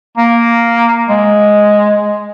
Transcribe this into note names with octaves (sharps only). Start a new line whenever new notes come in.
A#3
G#3